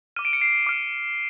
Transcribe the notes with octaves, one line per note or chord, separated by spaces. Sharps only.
D6 F6 D#7
D7
C#7
C7 D7
D6 F6